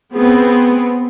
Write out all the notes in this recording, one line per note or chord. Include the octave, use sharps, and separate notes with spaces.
B3 C4 G#4